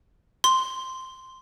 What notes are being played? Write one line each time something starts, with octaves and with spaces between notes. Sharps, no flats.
C6